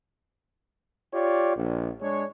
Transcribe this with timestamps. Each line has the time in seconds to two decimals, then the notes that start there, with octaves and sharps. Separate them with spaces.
1.13 F4 G4 C#5 D5
1.56 A#1
2.02 G#3 D4 C#5